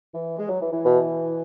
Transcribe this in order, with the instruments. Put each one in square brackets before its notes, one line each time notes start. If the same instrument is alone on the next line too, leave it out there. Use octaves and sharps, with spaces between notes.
[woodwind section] E3
G#3
F#3
E3
E3
[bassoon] B2